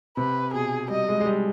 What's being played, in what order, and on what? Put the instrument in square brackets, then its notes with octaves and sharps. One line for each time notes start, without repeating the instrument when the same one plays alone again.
[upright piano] C3 [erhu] B4
[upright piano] B2 [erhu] G#4
[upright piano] G3 [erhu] D#5
[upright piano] G#3
G#3
G3